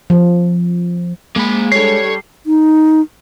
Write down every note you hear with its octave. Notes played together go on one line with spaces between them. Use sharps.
F3
G#3 A#3 G#4 B5
G3 D4 A4 C#5 C7
D#4